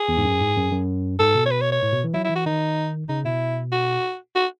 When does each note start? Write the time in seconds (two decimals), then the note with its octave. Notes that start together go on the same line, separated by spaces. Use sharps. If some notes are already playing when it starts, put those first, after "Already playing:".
Already playing: G#4
0.08 E2
0.17 G#2
0.24 F#2
0.40 G#2
0.56 F#2
0.72 F#2
1.19 G#2 A4
1.35 B2
1.45 C#5
1.51 B4
1.61 C#5
1.72 C#5
1.82 A2
1.93 B2
2.04 E3
2.14 F#3 E4
2.24 E4
2.30 E3
2.35 F#4
2.46 D#3 D#4
3.09 C#3 D#4
3.25 B2 E4
3.72 F#4
4.35 F#4